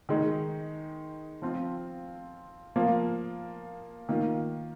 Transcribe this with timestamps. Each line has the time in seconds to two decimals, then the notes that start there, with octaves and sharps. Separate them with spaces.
0.09 D#3 G#3 D#4
1.42 F3 C4 F4
2.76 F3 A#3 F4
4.09 D#3 A#3 F4